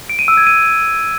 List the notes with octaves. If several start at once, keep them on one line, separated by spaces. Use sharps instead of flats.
D7
D#7
E6
G#6
D#7